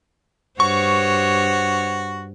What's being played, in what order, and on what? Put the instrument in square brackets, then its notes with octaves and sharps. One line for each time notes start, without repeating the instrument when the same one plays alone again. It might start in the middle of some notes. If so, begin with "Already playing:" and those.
[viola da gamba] G2 C5 C#5 [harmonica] F#4 [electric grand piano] C#6